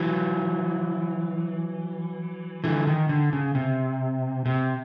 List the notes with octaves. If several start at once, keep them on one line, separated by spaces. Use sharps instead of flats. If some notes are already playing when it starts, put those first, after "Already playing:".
Already playing: E3 F#3
D3 E3
D#3
D3
C#3
C3
C3